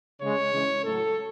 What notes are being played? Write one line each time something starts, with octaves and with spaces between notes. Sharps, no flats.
C#3 G#3 C#5
C#3 E3 G#3
A2 F#3 A4